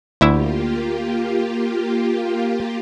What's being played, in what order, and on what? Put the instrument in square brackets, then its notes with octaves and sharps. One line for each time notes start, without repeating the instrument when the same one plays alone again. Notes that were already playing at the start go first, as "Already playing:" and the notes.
[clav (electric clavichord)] D2 E4 E5 [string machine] A#3 F4 G4